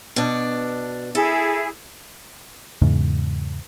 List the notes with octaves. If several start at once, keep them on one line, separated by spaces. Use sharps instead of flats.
B2 D4
E4 G#4 A4
E2 G#2 C#3